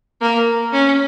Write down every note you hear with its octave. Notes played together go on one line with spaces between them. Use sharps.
A#3
C#4